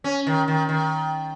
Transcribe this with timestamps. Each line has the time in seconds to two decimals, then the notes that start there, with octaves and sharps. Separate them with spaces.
0.04 C#4
0.27 D#3
0.48 D#3
0.69 D#3